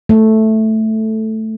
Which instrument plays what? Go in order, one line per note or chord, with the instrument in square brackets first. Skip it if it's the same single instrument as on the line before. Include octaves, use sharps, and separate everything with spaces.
[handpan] A3